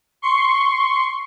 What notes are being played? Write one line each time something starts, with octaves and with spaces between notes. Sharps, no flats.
C6 C#6